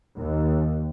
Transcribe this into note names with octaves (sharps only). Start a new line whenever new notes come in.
D#2